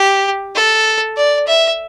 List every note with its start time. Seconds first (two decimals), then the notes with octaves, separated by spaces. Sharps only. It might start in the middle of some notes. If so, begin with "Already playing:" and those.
Already playing: G4
0.56 A4
1.17 D5
1.47 E5